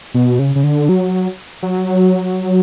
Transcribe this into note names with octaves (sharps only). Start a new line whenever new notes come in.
B2
C#3
C#3
D3
F#3
F#3